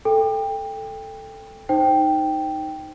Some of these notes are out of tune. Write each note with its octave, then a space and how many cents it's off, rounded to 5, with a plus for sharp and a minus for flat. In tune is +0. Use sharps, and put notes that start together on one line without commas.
A4 +0 G5 +20
D#4 +0 C5 +0 G5 +0